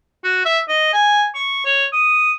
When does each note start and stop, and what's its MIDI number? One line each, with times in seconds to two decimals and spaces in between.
0.24 0.45 66
0.45 0.60 76
0.68 0.93 75
0.93 1.26 80
1.35 1.61 85
1.65 1.85 73
1.93 2.32 87